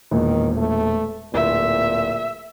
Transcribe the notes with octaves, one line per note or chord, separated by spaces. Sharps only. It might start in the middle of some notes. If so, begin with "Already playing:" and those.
E1 A#2 D#3
A3
D1 A#2 E5